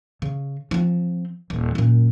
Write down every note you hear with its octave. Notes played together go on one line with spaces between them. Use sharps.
C#3
F3 C4
D#1
F#2 A#2